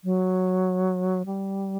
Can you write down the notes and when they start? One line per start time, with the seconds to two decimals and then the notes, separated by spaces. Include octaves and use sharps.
0.04 F#3
1.26 G3